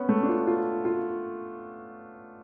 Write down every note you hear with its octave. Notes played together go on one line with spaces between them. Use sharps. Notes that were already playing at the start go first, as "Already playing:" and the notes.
Already playing: B3 C#4
A3
D4
F4
F4
F4